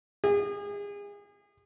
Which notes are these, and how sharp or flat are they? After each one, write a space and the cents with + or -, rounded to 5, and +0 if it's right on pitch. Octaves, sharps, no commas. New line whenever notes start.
G#4 -35